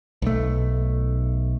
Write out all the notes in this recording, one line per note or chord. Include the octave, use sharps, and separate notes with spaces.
B1 A3